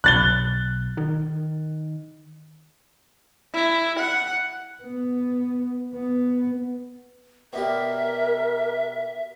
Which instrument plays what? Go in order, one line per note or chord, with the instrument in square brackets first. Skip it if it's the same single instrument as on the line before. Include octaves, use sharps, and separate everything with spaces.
[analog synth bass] B1 [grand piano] F#6 A6 G7
[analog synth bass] D#3
[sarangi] E4
F#5
[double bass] B3
B3
[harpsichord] B2 D4 G4 [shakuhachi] A#4 [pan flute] E5